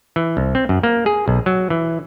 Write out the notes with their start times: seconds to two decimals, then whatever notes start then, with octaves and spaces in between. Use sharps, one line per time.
0.16 E3
0.37 C2
0.55 C4
0.69 F#2
0.83 A#3
1.06 G#4
1.28 B1
1.46 F#3
1.70 E3